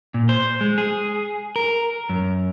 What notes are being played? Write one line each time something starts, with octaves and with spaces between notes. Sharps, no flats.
A#2
C5
G#3
G#4
A#4
F#2